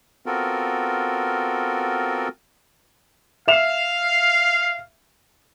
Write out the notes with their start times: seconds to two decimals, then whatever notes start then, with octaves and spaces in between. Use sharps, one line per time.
0.26 B3 C4 F4 F#4 A4 A#4
3.48 E5 F5 E7 F7